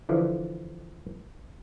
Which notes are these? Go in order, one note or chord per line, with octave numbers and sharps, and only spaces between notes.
D3 E3 F3